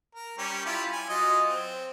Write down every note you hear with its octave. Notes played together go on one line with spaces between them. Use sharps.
A#4
G3 C#4 G4
E4 F4 G4
G#5
F#3 F4 D#5
C4